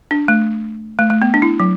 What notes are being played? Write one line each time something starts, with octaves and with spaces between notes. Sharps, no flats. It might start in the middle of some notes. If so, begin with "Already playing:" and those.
D4
A3
A3
A3
B3
D4
E4
F#3